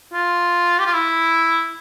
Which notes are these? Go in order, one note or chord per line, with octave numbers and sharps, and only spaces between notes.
F4
G4
F4
E4